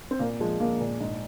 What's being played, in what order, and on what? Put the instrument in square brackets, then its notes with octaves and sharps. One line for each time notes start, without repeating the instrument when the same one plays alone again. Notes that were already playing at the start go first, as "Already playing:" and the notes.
[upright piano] C4
A#2 A#3
F3 G#3
F3 A#3
A#2
G#2